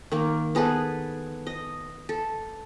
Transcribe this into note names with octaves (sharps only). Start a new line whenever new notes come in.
D#3 A#3
B3 G#4 A4 B4
D#5
A4